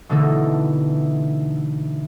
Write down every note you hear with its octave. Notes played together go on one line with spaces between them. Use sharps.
B2 D3 E3 A3 D#4 A4